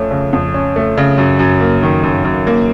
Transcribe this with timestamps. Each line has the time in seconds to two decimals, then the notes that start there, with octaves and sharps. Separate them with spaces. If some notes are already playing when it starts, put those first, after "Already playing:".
Already playing: F2 A3 C#4
0.11 C#3
0.33 F2
0.54 C#4
0.76 A3
0.97 C#3
1.18 F#2
1.39 F#2
1.60 A#3
1.83 D#3
2.03 F#2
2.24 F#2
2.47 A#3